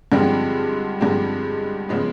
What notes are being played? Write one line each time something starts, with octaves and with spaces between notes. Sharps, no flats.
G2 D3 F3 G#3 C4
G2 D3 F3 G#3 C4
C#3 F3 G#3 B3